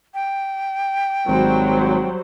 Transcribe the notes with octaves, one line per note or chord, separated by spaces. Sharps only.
G5
G#1 F#3 G3 C5